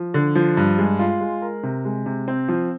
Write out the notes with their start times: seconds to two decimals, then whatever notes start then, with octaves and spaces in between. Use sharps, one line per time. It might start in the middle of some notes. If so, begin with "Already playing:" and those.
Already playing: F3
0.14 D3
0.35 F3
0.57 G2
0.78 G#3
0.99 F4
1.21 G#3
1.42 A#4
1.63 C3
1.85 G#3
2.06 C3
2.28 C4
2.49 F3